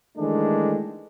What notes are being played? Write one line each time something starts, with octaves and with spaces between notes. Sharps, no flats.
D#3 E3 G#3 A3 D4